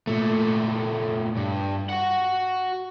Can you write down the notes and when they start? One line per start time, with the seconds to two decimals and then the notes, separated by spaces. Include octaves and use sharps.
0.07 A#2 A3
1.37 G2
1.89 F#4 F#5